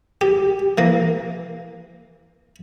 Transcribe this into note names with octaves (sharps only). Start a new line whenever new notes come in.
G4
E3 A#3